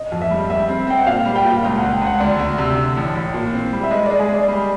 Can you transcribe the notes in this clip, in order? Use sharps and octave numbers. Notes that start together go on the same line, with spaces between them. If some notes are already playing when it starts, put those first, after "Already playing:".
Already playing: D#5
F2
E5
G3
G3 E5
C4
C4 G5
F#5
A#2 F5
G3
G5
A#2
C#2 F5
F#5
C#2
G5
C#2 F#5
D2 D5
D2
C3
D3
A1
A1
A#2
C4
G3
E5
G#3 D#5
G#3 D5
G#4
G#3
D5
G3